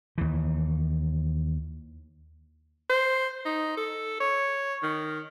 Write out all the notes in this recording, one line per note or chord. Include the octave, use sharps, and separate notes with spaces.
D#2 E3
C5
D#4
A4
C#5
D#3